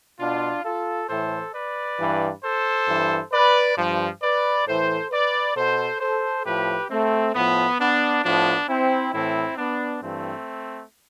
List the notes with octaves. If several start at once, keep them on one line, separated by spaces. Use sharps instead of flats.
B2 D4 F4
F4 A4
A2 E3 A4 C5
B4 D5
G2 E3
A4 C5
G2 E3
B4 D5
G2 F3
B4 D5
A2 E3 A4 C5
B4 D5
B2 A4 C5
A4 C5
A2 F3 G4 B4
A3 C4
A2 F3 B3
B3 D4
A2 F3 B3 D4
C4 E4
A2 E3 C4 E4
B3 D4
G2 E3 A3 C4